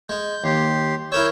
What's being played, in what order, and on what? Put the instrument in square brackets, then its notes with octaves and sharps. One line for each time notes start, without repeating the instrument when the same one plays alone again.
[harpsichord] G#3 [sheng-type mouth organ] G6
[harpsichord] D#2 [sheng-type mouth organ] G4 C6
[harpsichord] E4 A#4 C#5 [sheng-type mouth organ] E6 G6